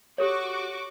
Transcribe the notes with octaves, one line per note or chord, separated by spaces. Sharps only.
F#4 G4 A4 C#5 C#6 D6